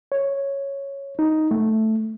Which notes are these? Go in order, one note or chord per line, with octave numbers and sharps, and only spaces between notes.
C#5
D#4
A3